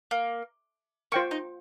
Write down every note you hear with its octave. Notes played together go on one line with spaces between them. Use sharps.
A#3
A#3 F4 C5 G5 C#6
D#4